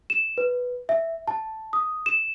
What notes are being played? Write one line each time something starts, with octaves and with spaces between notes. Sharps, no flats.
E7
B4
E5
A5
D#6
E7